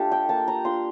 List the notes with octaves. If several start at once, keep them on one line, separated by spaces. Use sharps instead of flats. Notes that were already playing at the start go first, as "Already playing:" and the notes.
Already playing: A3 D4 F4 G4 A4
G5
A#3 A5
A#5
D4 F4 C6